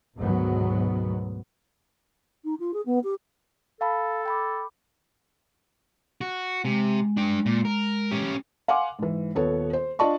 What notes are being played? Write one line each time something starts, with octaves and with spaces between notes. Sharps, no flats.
D2 G#2 B2 D#3 F#3 B3
D#4
F4
G#4
B3
G4
A4 F5 A5 B5
G5 B5 D6
F#4
C3 G#3
D4 G5
A#2
A#4
C#4 G4
F5 F#5 G#5 C6 D6
G#2 E3
D#1 B3 A4 C#5
C5
D4 F4 D5 D#5 A5 C#6